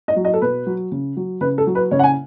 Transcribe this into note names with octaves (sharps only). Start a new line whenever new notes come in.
D#5
F#3
D#5
A4
B2 B4
F#3
C#3
F#3
C#3 B4
A4
F#3
B4
C#3 C#5
F#5
G#5